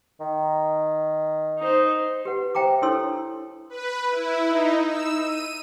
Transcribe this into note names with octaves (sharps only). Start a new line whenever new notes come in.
D#3
D#4 C5
G4 B4 F#5
C5 E5 G5 A#5 D6
D4 E4 A4 C#5 C6 E6
B4
E4
D#4
E6
D#7